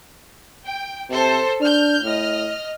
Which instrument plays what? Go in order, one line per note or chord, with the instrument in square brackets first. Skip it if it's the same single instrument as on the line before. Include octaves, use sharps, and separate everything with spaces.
[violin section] G5
[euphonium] C3 [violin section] A4 C5 A5
[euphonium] D4 [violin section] F6 G6
[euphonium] A2 [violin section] D#5 F6